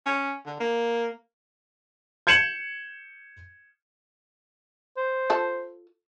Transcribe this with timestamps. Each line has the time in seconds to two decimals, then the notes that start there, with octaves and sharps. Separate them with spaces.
0.06 C#4
0.46 D3
0.60 A#3
2.27 G6 G#6 C#7 E7 F#7
4.97 C5
5.30 F4 A4 A5